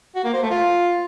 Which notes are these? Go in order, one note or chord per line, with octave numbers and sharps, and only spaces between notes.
F#4
A#3
C5
A3
F4